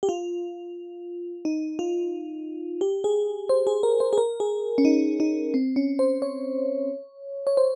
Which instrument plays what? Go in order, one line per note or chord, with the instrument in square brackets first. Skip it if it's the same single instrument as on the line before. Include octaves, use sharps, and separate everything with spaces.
[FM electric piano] G4
F4
D#4
F4
G4
G#4
C5
G#4
A#4
C5
G#4
A#4
G#4
C#4
D#4
D#4
C4
C#4
C5
C#5
C#5
C5